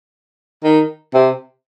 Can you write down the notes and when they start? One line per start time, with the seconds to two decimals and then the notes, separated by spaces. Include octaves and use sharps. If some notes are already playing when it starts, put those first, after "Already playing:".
0.64 D#3
1.14 C3